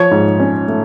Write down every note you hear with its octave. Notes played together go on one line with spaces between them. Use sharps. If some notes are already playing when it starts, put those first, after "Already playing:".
Already playing: F3 C#5
G#2
C#4
A3